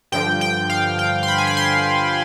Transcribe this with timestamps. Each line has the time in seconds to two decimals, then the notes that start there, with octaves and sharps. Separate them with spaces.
0.12 G2 D3 F3 G5
0.41 G5
0.70 F5
0.99 G5
1.23 C6
1.28 B5
1.38 G#5
1.47 B5
1.57 C6